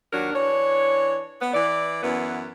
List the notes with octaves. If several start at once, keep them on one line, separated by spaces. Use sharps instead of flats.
D#2 F#3 D4 A#4
E3 D4 C#5
B3
E3 D5
F#2 E3 B3